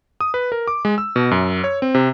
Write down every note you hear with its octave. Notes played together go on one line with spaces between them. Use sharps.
D#6
B4
A#4
D6
G#3
E6
B2
F#2
C#5
C4
C3